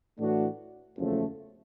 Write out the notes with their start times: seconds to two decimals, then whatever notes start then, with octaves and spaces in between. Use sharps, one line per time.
0.19 A2 E3 A3 D4 F#4
0.97 F#1 E2 C#3 F3 A3